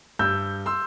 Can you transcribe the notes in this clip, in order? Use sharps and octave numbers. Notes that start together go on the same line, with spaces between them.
G2 E6 G6
C6 E6